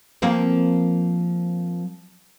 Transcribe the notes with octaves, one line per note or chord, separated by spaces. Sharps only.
F3 A#3 C4